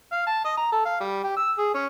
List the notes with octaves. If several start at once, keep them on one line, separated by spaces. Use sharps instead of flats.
F5
A5
D#5
A#5
A4
F5
G3
G4
E6
G#4
C#4